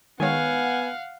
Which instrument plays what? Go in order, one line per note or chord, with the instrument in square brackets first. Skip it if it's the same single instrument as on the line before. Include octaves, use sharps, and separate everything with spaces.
[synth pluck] D#3 G#3 C#5 [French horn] B3 [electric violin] F5 F#5 [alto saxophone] G#5